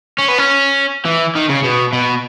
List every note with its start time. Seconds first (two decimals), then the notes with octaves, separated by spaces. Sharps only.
0.18 C#4
0.28 B3
0.38 C#4
1.05 E3
1.35 D#3
1.49 C#3
1.64 B2
1.93 B2